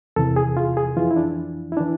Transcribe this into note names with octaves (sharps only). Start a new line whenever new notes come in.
E2 C3 E3 A4
G#4
F4
G#4
F2 E3 F4
E4
D4
E4
E3 D4